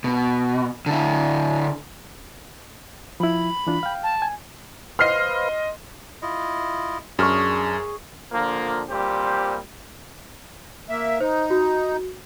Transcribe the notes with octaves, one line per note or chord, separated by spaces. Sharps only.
B2
D3 E4
F3 E4 B5
E3 D4 F4
F5 G5
A5
G#5
B4 C5 D#5 F5 C6 F6 C7
E4 F4 D#5
F#2 D4 G#4 C#6 F6
A#2 D3 F3 A#3
A#2 G3 C4 G4 C5
A#3 E5
D#4 C5
F#4